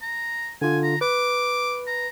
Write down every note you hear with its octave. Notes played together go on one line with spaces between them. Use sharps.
A#5
D3 F4 G#5
A#5
B4 D6
A#5